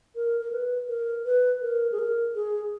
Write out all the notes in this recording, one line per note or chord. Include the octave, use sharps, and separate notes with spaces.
A#4
A#4
B4
A#4
B4
A#4
G#4
A#4
G#4